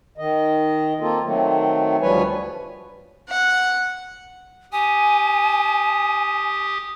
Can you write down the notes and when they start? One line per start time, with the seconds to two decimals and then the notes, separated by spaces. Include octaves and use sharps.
0.18 D#3 D#5
1.01 A#3 C4 F4 A4
1.24 D#3 F#3 A3 C4
2.01 D2 F3 G3 B4 C#5 G#5
3.29 F#5
4.72 G4 G#5 D#6